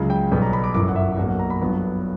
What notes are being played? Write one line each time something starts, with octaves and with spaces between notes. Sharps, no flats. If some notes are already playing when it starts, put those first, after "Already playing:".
Already playing: C#2 C#3 F#3
G5
B1 B2 G3 B3 G5
A#5
B5
D6
G1 F#2 E3 D6
F#5
E5
B1 B2 F#3 A#3 F#5
F#5
A#5
B5
G1 G2 F#3 B3